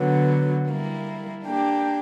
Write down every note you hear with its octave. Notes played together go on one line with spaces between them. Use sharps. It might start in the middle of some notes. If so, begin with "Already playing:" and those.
Already playing: D3 F#3 B3
G3 A#3 E4
A#3 D4 G4